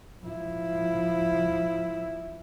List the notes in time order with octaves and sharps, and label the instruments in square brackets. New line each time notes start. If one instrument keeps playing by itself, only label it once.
[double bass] F3 E4